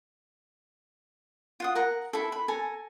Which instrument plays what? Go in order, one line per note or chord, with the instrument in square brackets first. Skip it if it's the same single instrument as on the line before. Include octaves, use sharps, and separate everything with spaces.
[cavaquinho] F4 F#5 D#6
A#4 F#5 A#5
E4 A4
B5
A4 G#5 A#5